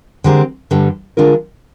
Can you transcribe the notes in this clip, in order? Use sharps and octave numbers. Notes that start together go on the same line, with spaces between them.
D3 G#3 C4 G4 A#4
G2 D3 G3
D3 G#3 D4 F4 A#4